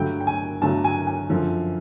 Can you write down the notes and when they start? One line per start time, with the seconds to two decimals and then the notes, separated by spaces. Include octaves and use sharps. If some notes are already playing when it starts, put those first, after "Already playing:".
Already playing: G2 D3 F#3 A3 G5
0.21 G5
0.27 G#5
0.62 G2 D3 F#3 A3 A5
0.84 G#5
1.07 G#5
1.30 F#2 D3 F3